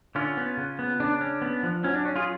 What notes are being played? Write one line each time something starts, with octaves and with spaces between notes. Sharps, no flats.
D3 C#4 F4
B3
C#3
B3
C#3 D4
C#4
B3
F3
F#3 C#4
D4
C#4
F4 G#4